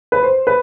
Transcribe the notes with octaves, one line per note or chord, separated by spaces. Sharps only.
B4
C5
B4